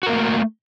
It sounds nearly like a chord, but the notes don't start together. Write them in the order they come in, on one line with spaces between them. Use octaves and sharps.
F#4 A#4 A#3 A3